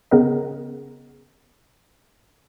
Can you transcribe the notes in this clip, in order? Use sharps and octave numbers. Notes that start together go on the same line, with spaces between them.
C#3 B3 A#4 D#5